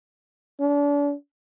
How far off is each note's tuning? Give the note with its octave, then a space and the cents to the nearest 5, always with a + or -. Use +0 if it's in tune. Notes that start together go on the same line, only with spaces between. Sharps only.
D4 -35